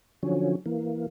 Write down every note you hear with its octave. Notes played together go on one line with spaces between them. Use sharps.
D3 F3 F#3 C#4
E3 A#3